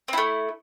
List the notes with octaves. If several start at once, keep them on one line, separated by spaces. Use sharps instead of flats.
A3 C4 E4